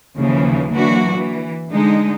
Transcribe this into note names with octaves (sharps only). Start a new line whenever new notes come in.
D#2 C#3 E3 F3
D3 E3 F#3 A#3 D4 F#4
E3
D3 G#3 D#4